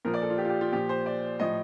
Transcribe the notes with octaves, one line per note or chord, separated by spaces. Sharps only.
A#2 F3 A#4
D5
A4
F4
G4
F4
G4
F4
A#2 F3 G4
C5
D5
A2 F3 D#5